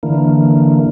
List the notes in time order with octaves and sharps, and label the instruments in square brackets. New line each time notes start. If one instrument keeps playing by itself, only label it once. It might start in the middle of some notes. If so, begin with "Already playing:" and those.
[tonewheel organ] D3 E3 A#3